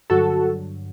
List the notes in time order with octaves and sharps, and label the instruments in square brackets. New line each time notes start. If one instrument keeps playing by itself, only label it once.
[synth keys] G2 D3 F#3 F#4 A4